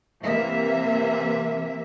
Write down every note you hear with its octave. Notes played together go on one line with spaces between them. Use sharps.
C3 E3 A#3 E5